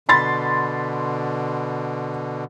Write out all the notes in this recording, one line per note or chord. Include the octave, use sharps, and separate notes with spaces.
B2 D3 B5 C6 A6